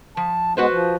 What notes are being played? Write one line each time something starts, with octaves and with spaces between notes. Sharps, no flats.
F3 A5
G#3 B3 F#4 B4 C5
F3